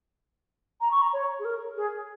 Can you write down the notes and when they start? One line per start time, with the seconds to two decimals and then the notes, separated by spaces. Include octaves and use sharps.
0.81 A#5
0.91 C#6
1.02 A#5
1.13 C#5
1.39 G#4
1.45 A#4
1.76 G#4